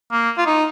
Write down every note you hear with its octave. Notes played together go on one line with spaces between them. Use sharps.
A#3
F4
D#4